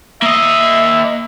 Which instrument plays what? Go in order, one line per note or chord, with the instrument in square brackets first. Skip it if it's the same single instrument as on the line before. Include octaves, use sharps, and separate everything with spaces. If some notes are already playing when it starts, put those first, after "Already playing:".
[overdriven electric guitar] A#3 D#5 [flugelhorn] E5